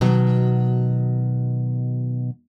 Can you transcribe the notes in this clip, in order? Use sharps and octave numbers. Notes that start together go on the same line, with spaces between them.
B2 D#3 F#3